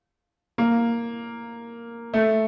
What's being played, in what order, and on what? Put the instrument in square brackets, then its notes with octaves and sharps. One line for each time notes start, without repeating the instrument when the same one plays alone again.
[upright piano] A#3
A3